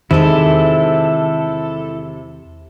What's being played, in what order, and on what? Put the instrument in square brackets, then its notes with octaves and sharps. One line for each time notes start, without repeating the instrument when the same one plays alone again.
[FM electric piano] E2 [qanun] C3 G#3 [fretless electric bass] D#3 [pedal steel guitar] E4 A4